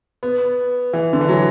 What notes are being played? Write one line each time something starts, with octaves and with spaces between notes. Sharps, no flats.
B3
E3
D3
E3
F#3